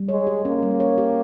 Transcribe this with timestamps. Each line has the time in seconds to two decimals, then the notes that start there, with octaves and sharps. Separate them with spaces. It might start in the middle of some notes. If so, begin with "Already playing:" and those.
Already playing: G3
0.09 G#3 C#5
0.27 G4
0.45 A#3 C#4
0.62 G3
0.80 C#5
0.98 G4